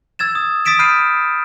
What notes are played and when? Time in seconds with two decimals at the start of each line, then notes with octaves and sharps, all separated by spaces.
0.19 E6 G#6 A6 E7
0.35 D#6
0.65 D#6 A6 B6 D7 E7
0.79 B5 F6 G6 C7 D#7